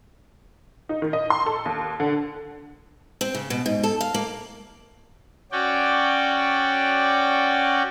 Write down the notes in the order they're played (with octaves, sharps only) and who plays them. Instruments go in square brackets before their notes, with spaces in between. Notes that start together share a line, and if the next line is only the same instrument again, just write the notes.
[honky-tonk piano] D#4
D#3
D#5
C6
A4
D#2
D3
[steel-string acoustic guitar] C4
C#3
B2
G#2
A4
F5
A#3
[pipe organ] C#4 F#4 D5 G5